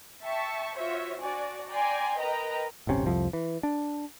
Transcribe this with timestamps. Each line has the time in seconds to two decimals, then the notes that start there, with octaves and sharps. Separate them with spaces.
0.23 E5 G5 A5 C#6
0.78 F4 F#4 C5 C#5 E5
1.21 D4 F#4 D5 G#5
1.69 D5 G5 G#5 A#5 C6
2.19 A#4 B4 D#5 G5 A#5
2.87 D1 G1 C3 C#4
3.06 C2 F2 F3
3.33 E3
3.63 D4